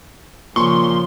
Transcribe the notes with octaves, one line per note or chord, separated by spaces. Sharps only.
A#2 C#3 F3 C6 C#6